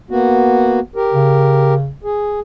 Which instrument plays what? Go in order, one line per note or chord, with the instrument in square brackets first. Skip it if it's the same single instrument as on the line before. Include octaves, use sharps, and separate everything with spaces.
[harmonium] A#3 B3 F#4
G4 A#4
[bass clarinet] C#3
[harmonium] G#4